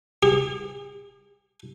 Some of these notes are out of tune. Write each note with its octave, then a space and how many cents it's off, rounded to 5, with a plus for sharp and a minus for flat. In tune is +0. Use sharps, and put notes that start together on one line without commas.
G#4 -45